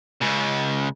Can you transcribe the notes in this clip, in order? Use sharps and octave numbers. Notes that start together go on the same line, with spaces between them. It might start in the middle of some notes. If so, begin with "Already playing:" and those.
C#2 C#3